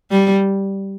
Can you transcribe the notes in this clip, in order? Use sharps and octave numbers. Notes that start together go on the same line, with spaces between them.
G3